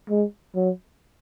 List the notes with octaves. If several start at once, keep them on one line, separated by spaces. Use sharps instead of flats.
G#3
F#3